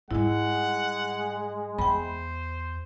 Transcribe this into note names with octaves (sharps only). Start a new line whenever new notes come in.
G#2 G3 G#3 E4 F#5
E2 C5 G5 B5